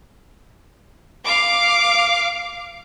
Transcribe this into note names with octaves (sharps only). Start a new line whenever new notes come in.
F5 D6